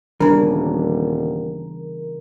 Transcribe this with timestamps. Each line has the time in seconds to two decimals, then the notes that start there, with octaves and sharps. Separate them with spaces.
0.20 D#1 C#3 E3 G3 B3 D4 A#4